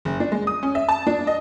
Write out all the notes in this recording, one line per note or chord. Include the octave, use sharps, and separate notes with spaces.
F#1
D4
G#3
D#6
C#4
E5
A5
D4
D#5